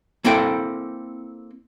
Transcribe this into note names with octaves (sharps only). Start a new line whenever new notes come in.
A#3 C4 E4 A4 G5